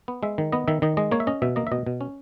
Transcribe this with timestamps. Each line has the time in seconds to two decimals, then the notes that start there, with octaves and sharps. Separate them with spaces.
0.08 B3
0.23 G#3 E5
0.38 D#3
0.52 B3 D#5
0.68 D#3 E5
0.82 D#3 D#5
0.97 G#3 D#5
1.11 A#3 C#5
1.20 E5
1.27 C#4 D#5
1.42 B2 E5
1.56 A#3 D#5
1.67 E5
1.72 B2 D#5
1.86 B2
2.01 C#4